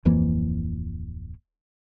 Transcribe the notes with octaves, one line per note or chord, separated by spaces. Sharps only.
D1 F2 E3 A#3